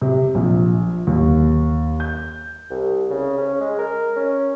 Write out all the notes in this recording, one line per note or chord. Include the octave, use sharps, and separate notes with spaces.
C3
A#1
D#2
G6
C2
C#3
C#4
G#3
A#4
C#4